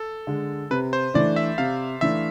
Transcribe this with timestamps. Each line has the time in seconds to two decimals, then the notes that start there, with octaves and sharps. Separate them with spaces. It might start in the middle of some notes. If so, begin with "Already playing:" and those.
Already playing: A4
0.27 D3 G#3
0.71 C3 B4
0.93 C5
1.14 E3 A3 D4 D5
1.36 E5
1.58 C3 F5
2.01 E3 A3 D4 E5